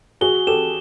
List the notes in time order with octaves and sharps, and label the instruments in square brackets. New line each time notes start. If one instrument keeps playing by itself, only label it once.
[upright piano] F#4 G#4 [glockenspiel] G7
[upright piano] G4 A4 [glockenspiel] E7